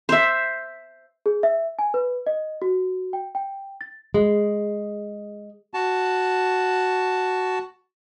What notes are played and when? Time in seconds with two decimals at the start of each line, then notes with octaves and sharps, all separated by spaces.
0.09 C5 E5
1.26 G#4
1.43 E5
1.79 G#5
1.94 B4
2.27 D#5
2.62 F#4
3.13 G5
3.35 G5
3.81 A6
4.14 G#3
5.74 F#4 A5